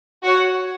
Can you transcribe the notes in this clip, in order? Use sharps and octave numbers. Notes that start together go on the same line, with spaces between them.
F#4 C#5 F#5